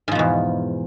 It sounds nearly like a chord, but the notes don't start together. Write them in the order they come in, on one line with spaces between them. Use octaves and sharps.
G#2 F3 B2 E2